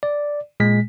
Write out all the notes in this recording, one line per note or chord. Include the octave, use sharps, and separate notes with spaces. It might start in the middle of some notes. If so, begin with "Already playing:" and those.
D5
A#2 G#3 B6